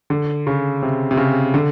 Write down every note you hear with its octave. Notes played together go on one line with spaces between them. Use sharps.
D3
C#3
C3
C3
C#3
D3